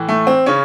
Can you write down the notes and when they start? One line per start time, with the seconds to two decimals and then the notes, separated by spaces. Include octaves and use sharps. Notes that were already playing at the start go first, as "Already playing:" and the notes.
Already playing: A2 E3
0.08 A3
0.27 C4
0.46 C#3 C#4